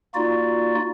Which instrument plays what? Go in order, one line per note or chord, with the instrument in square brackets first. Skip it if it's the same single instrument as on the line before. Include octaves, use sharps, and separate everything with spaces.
[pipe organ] A#3 D#4 F4 F#4 D5